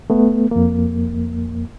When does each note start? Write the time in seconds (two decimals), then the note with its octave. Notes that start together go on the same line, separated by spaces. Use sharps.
0.10 A3 B3
0.51 F2 A#3